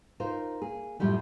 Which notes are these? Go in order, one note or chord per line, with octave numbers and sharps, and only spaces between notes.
D#4 F4 A#4 C5
A#3 G#4
F#2 A2 F3 G3 A3